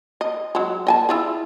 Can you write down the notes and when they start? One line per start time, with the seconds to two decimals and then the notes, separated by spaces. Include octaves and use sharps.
0.21 D#5
0.55 F#3 G#3
0.87 D#5 G#5 A5
1.09 E4 F4 G#4